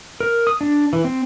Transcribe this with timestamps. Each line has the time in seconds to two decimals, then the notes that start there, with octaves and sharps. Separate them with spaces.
0.20 A#4
0.47 D#6
0.61 D4
0.93 E3
1.04 C4